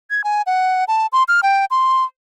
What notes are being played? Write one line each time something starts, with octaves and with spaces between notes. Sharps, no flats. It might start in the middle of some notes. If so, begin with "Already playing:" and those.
G#6
G#5
F#5
A5
C6
F6
G5
C6